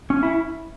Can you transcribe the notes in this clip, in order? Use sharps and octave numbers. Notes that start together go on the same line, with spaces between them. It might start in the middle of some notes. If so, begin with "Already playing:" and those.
C#4
E4